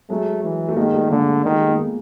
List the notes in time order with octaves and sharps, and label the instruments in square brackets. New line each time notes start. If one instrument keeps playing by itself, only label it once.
[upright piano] F#3 G#3 [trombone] A3
[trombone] E3
[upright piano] A3
[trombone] D#3 [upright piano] G#3 A#3
[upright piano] G3 A3
[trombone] D3 [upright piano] G#3 A#3
[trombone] D#3
[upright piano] G#3
A3
A#3
A3 B3